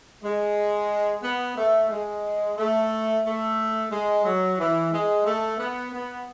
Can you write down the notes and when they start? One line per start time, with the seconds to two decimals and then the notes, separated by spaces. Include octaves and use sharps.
0.22 G#3
1.23 B3
1.56 A3
1.89 G#3
2.57 A3
3.24 A3
3.91 G#3
4.24 F#3
4.58 E3
4.91 G#3
5.25 A3
5.57 B3
5.92 B3